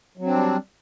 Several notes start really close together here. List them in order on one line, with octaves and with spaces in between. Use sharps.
F#3 C4 D4 G3